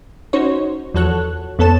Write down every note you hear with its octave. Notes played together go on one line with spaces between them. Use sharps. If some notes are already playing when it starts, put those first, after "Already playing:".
C#4 D#4 F#4 C5 C#5
E2 F3 F#4 A4 C#5 F#6
F2 B3 A4 C#5 A5 E7